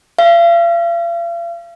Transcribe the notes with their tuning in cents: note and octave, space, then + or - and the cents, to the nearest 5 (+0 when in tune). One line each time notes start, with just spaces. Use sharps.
F5 -45